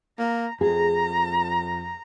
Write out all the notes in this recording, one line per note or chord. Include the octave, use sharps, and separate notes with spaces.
A#3 A#5
F2 G#4 A#5